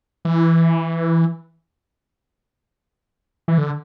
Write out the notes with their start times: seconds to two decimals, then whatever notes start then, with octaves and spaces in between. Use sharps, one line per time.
0.25 E3
3.48 E3
3.58 D3